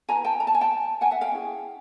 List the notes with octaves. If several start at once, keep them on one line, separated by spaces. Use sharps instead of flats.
E4 G#4 B4 G#5 A#5
G5 A5
A#5
A5
G#5
G5 A5
F#5 G#5
E5 F#5
F5 G5
C#4 E4 G#4